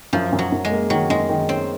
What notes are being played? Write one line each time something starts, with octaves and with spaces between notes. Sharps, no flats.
F#2 F3
F#2
F#3
F#2
G#3
A#3
D#3 F#3
F#2 G#3
D#3
C4 C#4